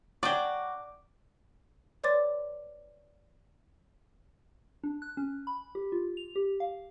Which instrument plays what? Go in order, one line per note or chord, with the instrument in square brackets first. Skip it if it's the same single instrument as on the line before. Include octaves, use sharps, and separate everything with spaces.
[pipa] F#3 D4 F#4 [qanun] D5 G5 [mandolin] D6
[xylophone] B4 C#5 D5 C6 D6 A6
[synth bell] D4
F#6
C#4
B5
G4
F4
F7
G4
F5